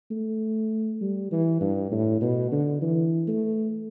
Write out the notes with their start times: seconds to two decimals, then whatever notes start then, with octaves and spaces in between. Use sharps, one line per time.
0.11 A3
1.01 G3
1.32 E3
1.61 G2
1.92 A2
2.21 B2
2.52 D3
2.82 E3
3.28 A3